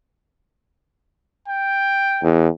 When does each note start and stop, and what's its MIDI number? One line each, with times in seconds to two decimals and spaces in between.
1.48 2.27 79
2.23 2.49 40